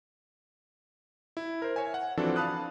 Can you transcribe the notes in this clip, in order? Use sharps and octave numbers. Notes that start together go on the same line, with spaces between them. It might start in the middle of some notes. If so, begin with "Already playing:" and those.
E4
A#4 C5
C#5 E5 G#5
F#5
E3 F3 C4 D4 F#4 A4
F5 A5 B5 D#6 F#6